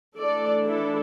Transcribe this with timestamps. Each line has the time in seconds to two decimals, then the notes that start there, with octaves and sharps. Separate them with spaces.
0.18 E3 A3 D4 A4 D5
0.65 E4 A4